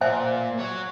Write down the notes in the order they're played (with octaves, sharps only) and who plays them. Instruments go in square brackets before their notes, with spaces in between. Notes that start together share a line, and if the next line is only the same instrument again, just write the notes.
[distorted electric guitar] A#2 [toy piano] C5 E5 G#5
[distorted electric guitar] C#5 F#5